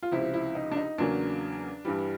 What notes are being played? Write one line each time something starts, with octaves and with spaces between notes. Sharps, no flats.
F4
C#2 C3 F3 E4
E4
D#4
D4
D#4
E2 C#3 F#3 A#3 C#4 D4
G2 E3 G3